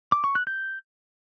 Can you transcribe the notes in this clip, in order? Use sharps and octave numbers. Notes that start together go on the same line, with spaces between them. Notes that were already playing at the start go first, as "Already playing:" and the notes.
D6
C#6
F#6
G6